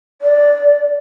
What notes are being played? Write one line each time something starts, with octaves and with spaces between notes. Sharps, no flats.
D5